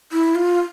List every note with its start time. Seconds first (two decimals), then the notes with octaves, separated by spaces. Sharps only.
0.12 E4
0.35 F4